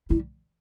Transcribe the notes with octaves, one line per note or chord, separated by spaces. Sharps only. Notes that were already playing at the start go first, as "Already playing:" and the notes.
G3 E4